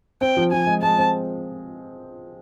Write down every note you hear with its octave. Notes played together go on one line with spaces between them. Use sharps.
C4 G5
F3
F3 G#5
G#3
G#3 A5
C4